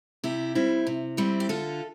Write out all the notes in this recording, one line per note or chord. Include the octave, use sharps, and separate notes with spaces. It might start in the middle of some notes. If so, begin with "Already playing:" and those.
C3 E4 G4
G3 C4 E4
C3
G3 C4 E4
G4
D3 F4 A4